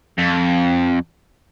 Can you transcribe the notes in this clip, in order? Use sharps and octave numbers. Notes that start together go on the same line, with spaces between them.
F2